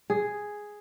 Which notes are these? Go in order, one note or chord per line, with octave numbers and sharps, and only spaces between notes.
G#4